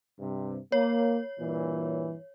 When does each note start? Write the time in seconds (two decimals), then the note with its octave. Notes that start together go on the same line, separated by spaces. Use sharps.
0.19 G2 C3
0.72 A#3 C#5
1.40 G2 A#2 E3